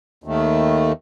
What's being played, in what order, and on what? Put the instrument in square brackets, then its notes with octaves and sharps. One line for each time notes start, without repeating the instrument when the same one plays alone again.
[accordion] D#2 D#3 A3